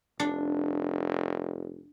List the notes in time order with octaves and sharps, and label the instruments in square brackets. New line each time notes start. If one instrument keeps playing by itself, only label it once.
[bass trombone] F1 [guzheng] D4